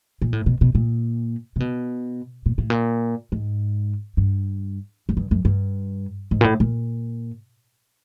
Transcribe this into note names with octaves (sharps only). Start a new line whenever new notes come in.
A#2
A2
B2
B2
A#2
C3
B2
A#2
A2
A#2
G#2
G2
F#2
G2
F#2
G2
G#2
A#2
A2
A#2